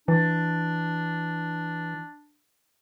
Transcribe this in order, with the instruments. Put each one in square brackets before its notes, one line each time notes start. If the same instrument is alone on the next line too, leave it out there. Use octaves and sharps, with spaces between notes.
[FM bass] E3 [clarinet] D4